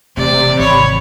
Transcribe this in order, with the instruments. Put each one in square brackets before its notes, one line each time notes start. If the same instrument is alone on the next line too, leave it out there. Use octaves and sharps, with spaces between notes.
[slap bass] E1 A3 [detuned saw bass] C3 [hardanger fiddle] D5
[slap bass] G#1 E3 [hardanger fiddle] C#5 [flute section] B5